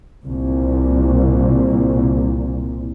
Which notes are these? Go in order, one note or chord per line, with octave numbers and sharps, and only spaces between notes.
C2 A#2